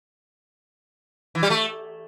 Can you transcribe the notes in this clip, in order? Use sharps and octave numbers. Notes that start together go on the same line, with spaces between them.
E3
G3
A3